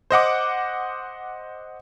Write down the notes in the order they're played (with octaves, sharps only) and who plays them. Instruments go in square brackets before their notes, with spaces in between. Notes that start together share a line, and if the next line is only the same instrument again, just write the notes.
[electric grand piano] C5 D#5 F#5 D6